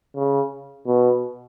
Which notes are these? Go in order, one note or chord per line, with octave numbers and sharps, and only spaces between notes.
C#3
B2